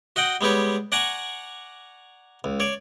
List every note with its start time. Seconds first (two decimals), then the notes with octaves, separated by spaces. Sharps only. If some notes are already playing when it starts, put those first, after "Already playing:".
0.16 F#4 D#5 F#5 G5
0.41 G3 G#3 B3 G4 C#5
0.92 D5 F#5 G#5 A#5 C#6
2.44 C#2
2.60 C#5 D5